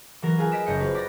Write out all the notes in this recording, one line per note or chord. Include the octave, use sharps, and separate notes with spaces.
E3 F#3 A#4
F4 G#4 B4 F5 G#5
D#5 B6 D7 E7
F#1 D#5 G6 C#7 D7
F4 F#4 B4 C5
D5 B5 A#6